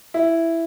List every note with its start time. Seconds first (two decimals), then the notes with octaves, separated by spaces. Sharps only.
0.14 E4